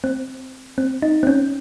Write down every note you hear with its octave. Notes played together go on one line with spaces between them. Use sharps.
C4
C4
D#4
C4
C#4